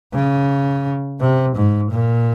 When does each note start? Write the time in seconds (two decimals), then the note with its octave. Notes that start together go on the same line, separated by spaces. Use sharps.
0.13 C#3
1.20 C3
1.56 G#2
1.91 A#2